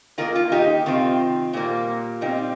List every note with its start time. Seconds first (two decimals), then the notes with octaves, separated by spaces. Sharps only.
0.18 D#3 A#3 F4 A#4
0.35 F4
0.52 D#4 G4
0.86 C3 D#3 C4 F4
1.53 A#2 G3 A#3
2.21 A#2 G3 C4 D#4